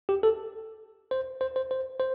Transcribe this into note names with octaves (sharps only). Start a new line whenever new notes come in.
G4
A4
C5
C5
C5
C5
C5